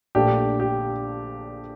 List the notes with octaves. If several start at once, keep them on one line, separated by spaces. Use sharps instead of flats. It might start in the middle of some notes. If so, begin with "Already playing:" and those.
A#1 A#2 A3 D4 G4
G4